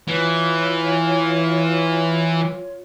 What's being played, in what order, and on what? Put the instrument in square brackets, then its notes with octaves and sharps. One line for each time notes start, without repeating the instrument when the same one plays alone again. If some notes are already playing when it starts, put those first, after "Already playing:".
[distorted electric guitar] E3 [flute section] F4 C#5